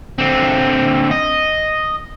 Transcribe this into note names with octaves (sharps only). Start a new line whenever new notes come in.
D3 C4
D#5